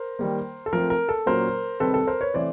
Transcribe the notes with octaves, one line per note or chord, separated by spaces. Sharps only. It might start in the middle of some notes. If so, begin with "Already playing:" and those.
Already playing: A#4 C5
D#3 G3 A#3
A4
F3 A3 C4 A#4
A#4
A4
A#2 F#3 A#3 C#4 A#4 C5
C3 D#3 G3 C4 A4 B4
A4
A#4 C5
B4 C#5
C3 E3 A3 C5 D5